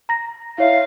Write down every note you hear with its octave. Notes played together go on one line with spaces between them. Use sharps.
A#5 A#6
E4 C#5 E5 F5